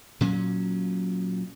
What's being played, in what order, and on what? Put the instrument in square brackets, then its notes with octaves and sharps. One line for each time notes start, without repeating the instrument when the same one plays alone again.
[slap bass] A#2 F#3 C#4